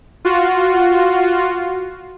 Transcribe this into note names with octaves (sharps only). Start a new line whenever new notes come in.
F4 F#4